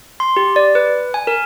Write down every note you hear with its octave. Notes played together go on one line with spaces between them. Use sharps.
C6
G4
D5
B4
G#5
A#4